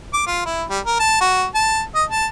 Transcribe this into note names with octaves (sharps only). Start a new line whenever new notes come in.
D6
F4
E4
G3
A#4
A5
F#4
A5
D#5
A5